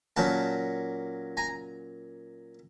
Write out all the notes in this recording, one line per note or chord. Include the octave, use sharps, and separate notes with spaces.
A#2 F#3 A#3 C#4 G5 A5
G#5 A#5